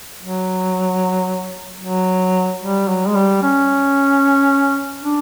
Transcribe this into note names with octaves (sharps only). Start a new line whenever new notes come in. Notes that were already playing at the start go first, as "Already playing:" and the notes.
F#3
F#3
G3
F#3
G#3
G3
C#4
D4